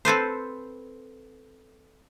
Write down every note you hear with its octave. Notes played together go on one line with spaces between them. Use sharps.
C4 A4 B4 C5